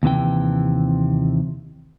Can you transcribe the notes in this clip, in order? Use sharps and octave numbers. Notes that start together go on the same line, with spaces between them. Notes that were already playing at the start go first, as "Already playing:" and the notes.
D#2 C3 E3 G5